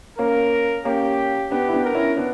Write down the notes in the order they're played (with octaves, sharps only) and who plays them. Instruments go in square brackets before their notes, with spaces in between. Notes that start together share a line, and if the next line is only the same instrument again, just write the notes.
[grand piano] A#3 C#4 [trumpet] A#4
[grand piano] A#3 C#4 [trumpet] G4
[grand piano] B3 D4 [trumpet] G4
[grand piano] E4
B3 D4
[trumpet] A#4
[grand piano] C#4 E4
B3 D4